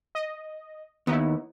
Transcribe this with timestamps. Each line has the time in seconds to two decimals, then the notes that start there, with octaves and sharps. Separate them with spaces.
0.15 D#5
1.07 D#2 B3 D#4 E4